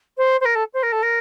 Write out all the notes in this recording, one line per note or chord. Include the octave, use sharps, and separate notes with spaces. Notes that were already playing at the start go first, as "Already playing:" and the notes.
C5
C5
A#4
A4
C5
A#4
A4
A#4